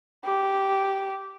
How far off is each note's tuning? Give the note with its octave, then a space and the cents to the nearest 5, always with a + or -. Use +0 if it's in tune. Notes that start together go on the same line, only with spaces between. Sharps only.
G4 -10